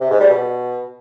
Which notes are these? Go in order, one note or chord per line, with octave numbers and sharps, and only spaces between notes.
C3
G#2
G3
B2